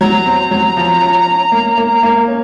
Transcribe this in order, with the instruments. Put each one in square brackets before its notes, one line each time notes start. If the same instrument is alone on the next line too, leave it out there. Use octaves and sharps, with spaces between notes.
[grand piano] F#3 [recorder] A#5
[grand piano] C4
F#3
F3
C#4
C#4
A#3
A#3
A#3
C#4